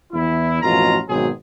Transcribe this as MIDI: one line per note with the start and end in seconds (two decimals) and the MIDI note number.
0.13 0.58 40
0.13 0.58 64
0.62 0.98 33
0.62 0.98 41
0.62 0.98 47
0.62 0.98 65
0.62 0.98 82
1.08 1.28 32
1.08 1.28 47
1.08 1.28 54
1.08 1.28 60
1.08 1.28 68